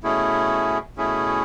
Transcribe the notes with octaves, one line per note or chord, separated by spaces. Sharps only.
B2 A3 C#4 E4 G#4
B2 A3 C#4 E4 G#4